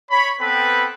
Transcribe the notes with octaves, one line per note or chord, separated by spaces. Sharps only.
C#5 B5
B3 C4 A4 B4 G5 B5